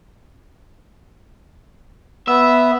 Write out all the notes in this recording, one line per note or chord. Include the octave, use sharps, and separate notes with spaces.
B3 E5